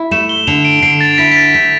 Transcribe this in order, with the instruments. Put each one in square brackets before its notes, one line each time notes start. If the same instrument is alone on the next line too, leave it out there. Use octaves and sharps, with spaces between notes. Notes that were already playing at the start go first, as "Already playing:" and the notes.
Already playing: [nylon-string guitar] E4
[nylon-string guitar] A3 [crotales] E7
[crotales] G7
[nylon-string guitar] D3 [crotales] F7
[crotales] D7
[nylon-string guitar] D3 [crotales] C7
[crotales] A6
[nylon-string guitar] E4 [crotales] B6
[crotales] B6
A6
[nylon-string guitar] A3 [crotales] B6